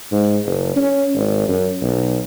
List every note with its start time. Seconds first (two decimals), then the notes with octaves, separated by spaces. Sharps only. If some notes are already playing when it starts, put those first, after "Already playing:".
0.12 G#2
0.46 F#1
0.76 C#4
1.15 G#1
1.48 F#2
1.81 B1